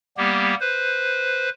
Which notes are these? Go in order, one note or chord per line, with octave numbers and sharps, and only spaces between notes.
G3 A#3 B3 G4
B4 C5